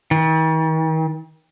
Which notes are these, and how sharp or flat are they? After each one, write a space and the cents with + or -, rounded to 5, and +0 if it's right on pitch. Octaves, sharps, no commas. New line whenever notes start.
D#3 +45